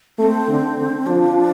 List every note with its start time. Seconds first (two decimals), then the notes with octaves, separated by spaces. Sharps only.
0.19 A3 C4
0.48 D3
0.78 D3
1.06 F3 D4